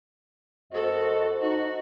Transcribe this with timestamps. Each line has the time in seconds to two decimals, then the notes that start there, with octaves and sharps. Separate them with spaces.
0.72 F#2 F#4 A4 C5 D#5
1.41 D#4 F#4